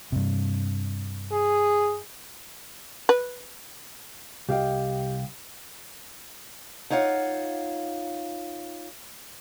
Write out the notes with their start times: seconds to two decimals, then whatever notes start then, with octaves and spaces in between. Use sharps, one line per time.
0.12 G2 C3
1.32 G#4
3.09 B4
4.49 C2 G4 D#5 F5 G5
6.90 D#4 F4 C#5 F5 F#5